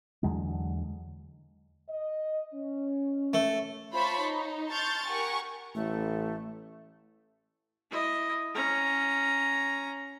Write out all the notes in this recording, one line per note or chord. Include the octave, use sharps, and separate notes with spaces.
E2 D3 F#3 G#3
D#5
C#4
A3
F4 C5 C#5 A5 B5 C#6
D#4
A5 C6 C#6 F6 G6 A6
G4 A#4 F#5 G#5 C#6
A1 A3
E4 D#5
C#4 A#5